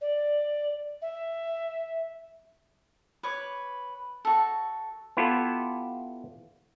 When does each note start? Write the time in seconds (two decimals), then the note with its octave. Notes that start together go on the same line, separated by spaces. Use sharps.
0.01 D5
1.02 E5
3.23 B4 C#5 D6
4.25 F#4 A4
5.17 B3 E4 F4 G4 A4